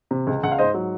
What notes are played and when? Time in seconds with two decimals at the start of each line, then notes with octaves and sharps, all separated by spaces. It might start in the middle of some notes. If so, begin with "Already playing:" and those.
0.11 C3
0.27 C#2
0.43 C#2 F#5
0.52 F5
0.59 G#2 C5 D#5
0.74 F#3